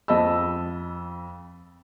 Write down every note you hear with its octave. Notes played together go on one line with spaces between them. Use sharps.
F2 D#5 A5 B5 E6